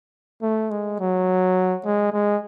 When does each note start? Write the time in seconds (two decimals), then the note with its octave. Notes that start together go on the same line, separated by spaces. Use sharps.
0.42 A3
0.71 G#3
1.00 F#3
1.85 G#3
2.12 G#3